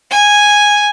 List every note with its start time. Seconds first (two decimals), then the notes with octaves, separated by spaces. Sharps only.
0.10 G#5